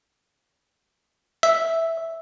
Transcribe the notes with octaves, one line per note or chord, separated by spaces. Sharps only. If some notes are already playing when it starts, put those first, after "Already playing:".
E5